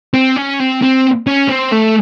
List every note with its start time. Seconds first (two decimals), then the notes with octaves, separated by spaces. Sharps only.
0.14 C4
0.36 C#4
0.59 C4
0.82 C4
1.27 C#4
1.49 C4
1.72 A3